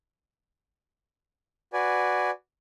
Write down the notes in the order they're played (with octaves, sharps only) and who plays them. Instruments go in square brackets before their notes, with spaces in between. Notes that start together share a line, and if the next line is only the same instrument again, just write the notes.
[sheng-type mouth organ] F#4 B4 D5 G#5